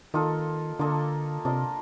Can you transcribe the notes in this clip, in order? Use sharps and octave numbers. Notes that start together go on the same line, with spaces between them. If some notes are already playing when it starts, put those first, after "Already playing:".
D#3 A#3 F4 A4 D#5
D3 A#3 F4 A4 D#5
C3 D4 F4 A#4 D#5